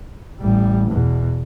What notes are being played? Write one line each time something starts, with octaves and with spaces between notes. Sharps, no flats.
A1 G3
E2 B2